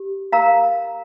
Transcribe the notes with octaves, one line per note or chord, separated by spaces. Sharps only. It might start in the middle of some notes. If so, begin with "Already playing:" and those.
Already playing: G4
A#4 F5 A#5